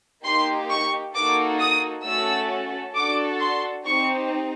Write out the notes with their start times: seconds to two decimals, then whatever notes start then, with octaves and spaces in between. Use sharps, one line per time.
0.24 A#3 D#4 G4 C6
0.70 C#6
1.14 A#3 D#4 F#4 A4 D6
1.59 D#6
2.04 A3 C#4 F#4 A4 E6
2.94 D4 F#4 A4 D6
3.40 C6
3.84 C4 D#4 G4 C#6